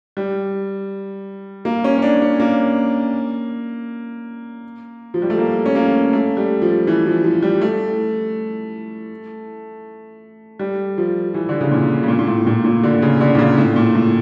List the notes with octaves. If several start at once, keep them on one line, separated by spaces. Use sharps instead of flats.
G3
A#3
C#4
C#4
D4
C#4
A#3
F3
G3
A3
A#3
C#4
A#3
A3
G3
F3
E3
F3
F3
G3
A3
G3
F3
E3
D3
C#3
A#2
C#3
A#2
A#2
A2
A#2
A#2
D3
C#3
D3
A#2
C#3
A2
A#2
A2